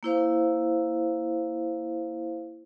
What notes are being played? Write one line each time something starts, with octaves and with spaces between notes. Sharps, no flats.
A#3 E4 C5 F5